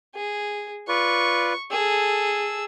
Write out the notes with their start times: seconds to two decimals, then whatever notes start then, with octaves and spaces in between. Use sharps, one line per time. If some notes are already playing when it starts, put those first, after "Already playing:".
0.15 G#4
0.88 F4 B4 D5 C#6
1.71 G#4 A4 E6